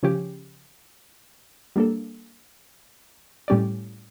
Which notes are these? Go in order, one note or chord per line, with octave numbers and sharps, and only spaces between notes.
C#3 F3 C#4 G4
G3 A#3 D4 A4
A2 G3 C#4 G4 D5